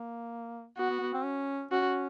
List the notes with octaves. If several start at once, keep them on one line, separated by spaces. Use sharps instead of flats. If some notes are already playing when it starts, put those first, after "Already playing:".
Already playing: A#3
B3 F#4
B3
B3
C4
C#4
C#4 F#4